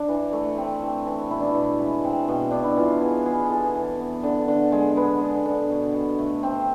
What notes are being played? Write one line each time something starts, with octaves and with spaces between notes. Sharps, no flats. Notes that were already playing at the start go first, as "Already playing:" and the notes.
Already playing: D4
E3
A3
C4
E3
E3
B2 E4
D4
B2 E4
G#3
C4
B2
B2 D4
E4
E3 F4
B3 G#4
B3 G#4
E3 G#4 A4
E3
B3
D3
D3
G#3
B3 B4
D3
D3
B2
B2
A3
C4